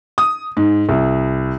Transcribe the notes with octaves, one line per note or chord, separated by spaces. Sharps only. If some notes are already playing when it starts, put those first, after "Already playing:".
D#6
G#2
C2